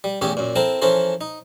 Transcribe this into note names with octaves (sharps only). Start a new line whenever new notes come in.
G3
A1 E2 C#3 C#4 G4 G#5
F#2 A#2
C4 E4 A4 A#4 C5
E3 F3 C#4 A4 A#4 C5
D#4